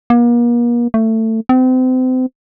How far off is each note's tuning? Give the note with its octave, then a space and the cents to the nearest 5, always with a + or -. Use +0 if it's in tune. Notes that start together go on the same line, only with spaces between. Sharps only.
A#3 +40
A3 +20
C4 -35